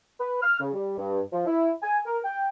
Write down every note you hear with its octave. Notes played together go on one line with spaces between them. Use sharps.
B4
F6
C#3
G3
G2
F3
E4
G#5
A#4
G5